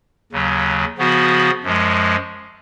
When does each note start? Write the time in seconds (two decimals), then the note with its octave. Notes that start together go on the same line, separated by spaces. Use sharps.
0.32 D#2 C#3 F#3
0.98 C#3 F3 B3 F#4
1.63 F#2 F3 G#3